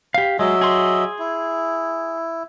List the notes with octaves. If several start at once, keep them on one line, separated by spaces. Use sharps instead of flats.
G4 F5
F#3 G#3 D#5 E5
G#4 C6
E4